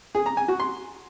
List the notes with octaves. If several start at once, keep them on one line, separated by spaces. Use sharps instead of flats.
G#4
A#5
G#5
F#4
C6